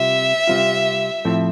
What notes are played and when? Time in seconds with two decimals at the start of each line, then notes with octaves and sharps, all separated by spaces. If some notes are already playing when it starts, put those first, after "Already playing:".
Already playing: C3 G3 C4 F4 E5
0.47 C3 G3 C4 F4
1.25 A2 F3 A3 C4 E4